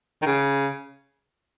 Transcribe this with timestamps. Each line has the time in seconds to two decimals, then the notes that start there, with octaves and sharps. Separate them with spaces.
0.22 D#3
0.26 C#3